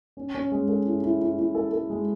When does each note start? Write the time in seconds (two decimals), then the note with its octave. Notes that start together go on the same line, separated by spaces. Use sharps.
0.17 C#4
0.35 C#4
0.52 G#3
0.69 A4
0.86 E4
1.03 E4
1.21 E4
1.38 E4
1.55 A4
1.73 A4
1.90 G#3